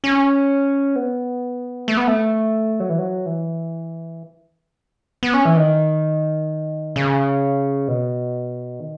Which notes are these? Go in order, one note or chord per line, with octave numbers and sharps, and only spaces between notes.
C#4
B3
A3
B3
A3
F#3
E3
F#3
E3
B3
C#4
E3
D#3
C#3
B2
D#3